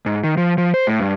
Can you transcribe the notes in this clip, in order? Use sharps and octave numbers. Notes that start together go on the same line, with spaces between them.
G#2
D#3
F3
F3
C5
A2
G2